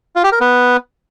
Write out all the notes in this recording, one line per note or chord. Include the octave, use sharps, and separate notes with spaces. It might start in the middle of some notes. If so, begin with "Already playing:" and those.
F4
G4
A#4
B3